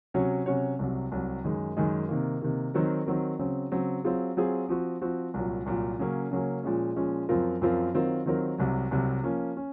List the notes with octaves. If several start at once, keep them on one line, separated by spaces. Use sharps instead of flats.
C3 F#3 C#4 F#4 C#5
C3 F#3 C#4 F#4 C#5
C2 C3 F#3
C2 C3 F#3
F#2 D#3 G#3
F#2 D#3 G#3
C3 D#3 A#3
C3 D#3 A#3
D#3 F#3 C4 F#4 A#4
D#3 F#3 C4 F#4 A#4
C#3 F#3 C4
C#3 F#3 C4
F#3 C4 F4 G#4
F#3 C4 F4 G#4
F3 C4 F#4
F3 C4 F#4
C2 A#2 F#3
C2 A#2 F#3
C#3 F#3 A#3 C#4
C#3 F#3 A#3 C#4
A#2 F3 G#3 C#4
A#2 F3 G#3 C#4
F#2 F3 C4 F4 A#4
F#2 F3 C4 F4 A#4
D#3 F#3 C4 F4 A#4
D#3 F#3 C4 F4 A#4
C2 C3 F#3
C2 C3 F#3
F3 A#3 C#4
C#4